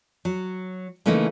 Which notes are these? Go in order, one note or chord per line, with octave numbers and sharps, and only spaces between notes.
F#3
C#3 E3 A3 A#3 C#4 D#4